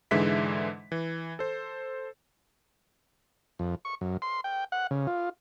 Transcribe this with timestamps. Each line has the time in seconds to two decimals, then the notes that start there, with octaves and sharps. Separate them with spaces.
0.11 G#2 D3 E3 G#3 E5 B6
0.92 E3
1.39 A4 C5
3.59 F2
3.85 C#6
4.01 F#2
4.22 C6
4.44 G5
4.72 F#5
4.91 C#3
5.07 F4